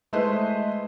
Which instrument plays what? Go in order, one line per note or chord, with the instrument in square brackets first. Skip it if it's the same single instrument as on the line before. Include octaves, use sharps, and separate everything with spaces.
[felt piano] G#3 A3 E4 B4 C5 D#5